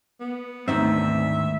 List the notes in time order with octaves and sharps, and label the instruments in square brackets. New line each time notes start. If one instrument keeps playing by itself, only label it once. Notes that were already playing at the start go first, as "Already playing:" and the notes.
[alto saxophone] B3
[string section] D2 [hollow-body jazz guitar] G#2 D#3 C4 [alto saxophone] E5